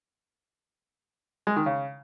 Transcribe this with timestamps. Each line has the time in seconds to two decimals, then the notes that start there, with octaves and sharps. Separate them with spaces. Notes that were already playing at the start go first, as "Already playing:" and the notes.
1.47 G#3
1.56 D#3
1.66 C#3